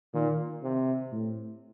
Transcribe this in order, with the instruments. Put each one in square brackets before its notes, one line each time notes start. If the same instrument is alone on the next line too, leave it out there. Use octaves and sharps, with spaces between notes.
[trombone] A#2 [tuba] D#3
[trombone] C3
[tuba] A2